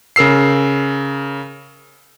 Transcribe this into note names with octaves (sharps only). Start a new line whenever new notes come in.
C#3 A#4 E6 C7